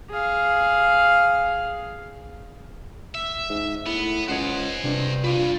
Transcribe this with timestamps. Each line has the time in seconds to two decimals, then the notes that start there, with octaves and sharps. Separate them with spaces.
0.10 G#4 F5
3.14 E5
3.49 G#2
3.86 A2 B3
4.28 C#2 C5 C#5 D#5 F#5 G#5
4.84 G2 C3 D4
5.24 F4 B4 D5